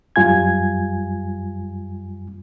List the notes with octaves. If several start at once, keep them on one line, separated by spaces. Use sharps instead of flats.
F#2 G3 F4 G#5 G#6